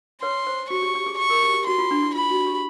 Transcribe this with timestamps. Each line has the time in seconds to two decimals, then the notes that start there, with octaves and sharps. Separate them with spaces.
0.22 B4 C#5 C6
0.47 C5
0.70 F#4 C#6
0.82 G4
0.95 G4
1.06 G#4
1.19 C#6
1.30 A#4
1.43 G4
1.54 G4
1.67 F#4 C6
1.78 F4
1.91 D4
2.03 E4
2.15 F4 B5
2.31 F#4
2.47 G4